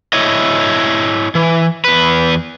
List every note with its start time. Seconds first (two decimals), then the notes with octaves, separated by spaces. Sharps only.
0.13 E4 C#5 D#5
1.35 E3
1.84 E2 B4